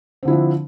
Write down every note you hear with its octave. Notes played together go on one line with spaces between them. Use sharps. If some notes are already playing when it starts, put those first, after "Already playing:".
D3 F3 C4 D4 E4